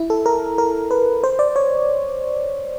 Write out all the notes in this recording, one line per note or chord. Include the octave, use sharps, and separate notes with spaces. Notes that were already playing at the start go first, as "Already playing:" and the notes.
Already playing: E4
A4
A#4
A#4
B4
C5
D5
C#5